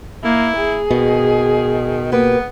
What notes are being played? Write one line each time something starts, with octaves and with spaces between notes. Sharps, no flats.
A#3 E4
G#4
B2 D#3 D#5
A#3 B3 G4 B4